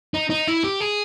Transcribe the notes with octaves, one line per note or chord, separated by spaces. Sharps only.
D#4
D#4
E4
G4
G#4